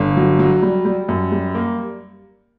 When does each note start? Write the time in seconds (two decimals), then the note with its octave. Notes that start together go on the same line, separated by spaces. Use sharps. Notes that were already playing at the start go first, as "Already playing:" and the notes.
Already playing: G1
0.17 F#3
0.39 F#3
0.62 G3
0.85 G3
1.09 F#2
1.32 G3
1.55 A#3